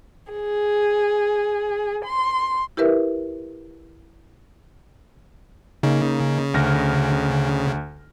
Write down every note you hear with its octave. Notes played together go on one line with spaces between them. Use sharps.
G#4
C6
E4 G4 A#4 B4 E5
C#3 A#3 D#4
D2 F6 A#6